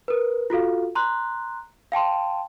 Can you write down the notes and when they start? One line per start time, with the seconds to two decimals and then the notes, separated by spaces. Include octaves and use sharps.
0.08 A#4 B4
0.50 F4 F#4 A4 F5
0.95 A#5 C6 F#6
1.92 F5 G5 A5 C6